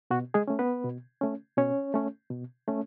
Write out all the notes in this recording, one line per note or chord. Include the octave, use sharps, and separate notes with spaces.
B2 F#4
G#3 G#4
A3 C#4
B3 B4
B2
A3 C#4
B2 C#4 C#5
A3 C#4
B2
A3 C#4